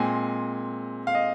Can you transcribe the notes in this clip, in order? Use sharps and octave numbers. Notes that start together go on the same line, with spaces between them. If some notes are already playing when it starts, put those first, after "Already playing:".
Already playing: A#2 G#3 C4 G#5
F5
D#5